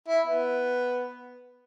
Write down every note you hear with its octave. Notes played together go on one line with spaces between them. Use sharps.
E4
B3